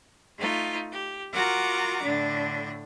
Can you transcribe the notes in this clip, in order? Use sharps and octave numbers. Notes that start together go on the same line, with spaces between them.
A3 D#4 F4
G4
F4 F#4 A#4 F#5 A#5 D6
A2 D3 D4